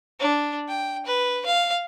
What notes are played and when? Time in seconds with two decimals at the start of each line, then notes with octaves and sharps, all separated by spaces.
0.20 D4
0.68 G5
1.06 B4
1.46 F5